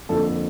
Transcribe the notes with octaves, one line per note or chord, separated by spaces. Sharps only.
F2 D3 F3 A#3 A4